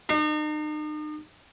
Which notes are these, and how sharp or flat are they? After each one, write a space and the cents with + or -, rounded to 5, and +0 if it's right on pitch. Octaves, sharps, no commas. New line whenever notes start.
D#4 -40